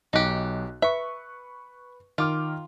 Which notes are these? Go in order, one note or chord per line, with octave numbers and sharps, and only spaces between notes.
B1 D#4 G4 F#6
B4 E5 C#6
D#3 F4 D6 F6